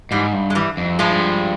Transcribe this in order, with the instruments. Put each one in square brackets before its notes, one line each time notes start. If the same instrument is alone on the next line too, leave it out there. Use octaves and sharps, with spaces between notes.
[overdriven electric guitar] G#2 [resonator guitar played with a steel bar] E3 G3
[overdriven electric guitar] G2
[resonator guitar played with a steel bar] G#3
E3 G3
[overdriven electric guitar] F2
[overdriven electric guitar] G2 [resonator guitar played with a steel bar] F3 G#3